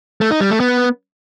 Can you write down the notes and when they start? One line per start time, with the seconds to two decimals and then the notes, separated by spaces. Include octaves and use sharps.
0.21 A3
0.31 D#4
0.41 G3
0.50 A3
0.60 B3